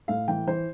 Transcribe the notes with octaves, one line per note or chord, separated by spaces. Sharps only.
A2 F5
E3 G5
E3 C5